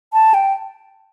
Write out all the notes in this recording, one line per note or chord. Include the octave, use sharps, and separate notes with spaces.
A5
G5